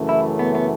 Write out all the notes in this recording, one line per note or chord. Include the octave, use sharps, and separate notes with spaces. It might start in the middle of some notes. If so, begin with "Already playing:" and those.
Already playing: F#2 C#3 E3 A3
E4
B3
B3